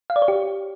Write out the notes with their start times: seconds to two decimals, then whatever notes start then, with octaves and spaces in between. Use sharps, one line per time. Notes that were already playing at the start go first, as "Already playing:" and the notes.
0.10 F5
0.16 D5
0.22 C#5
0.28 G4